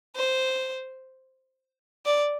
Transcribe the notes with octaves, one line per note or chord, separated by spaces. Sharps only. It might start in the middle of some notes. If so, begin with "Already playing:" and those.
C5
D5